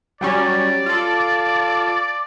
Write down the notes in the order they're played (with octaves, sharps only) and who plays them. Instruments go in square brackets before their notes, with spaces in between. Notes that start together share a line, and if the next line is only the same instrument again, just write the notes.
[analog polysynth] F#3 G3 C#4 [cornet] D5
[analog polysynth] F4 A4